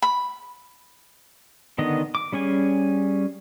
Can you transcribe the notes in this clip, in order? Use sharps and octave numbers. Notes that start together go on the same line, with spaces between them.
B5
D3 D#3 B3 D#5
D6
G3 C#4 G#4 G#5